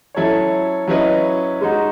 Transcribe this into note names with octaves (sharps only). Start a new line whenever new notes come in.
F#3 C#4 E4 A4 C#5
F#3 C#4 E4 B4 D#5
G#3 D#4 F#4